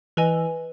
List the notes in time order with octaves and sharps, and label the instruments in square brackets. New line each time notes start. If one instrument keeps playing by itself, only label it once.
[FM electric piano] E3 [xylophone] B4 D#5 G#5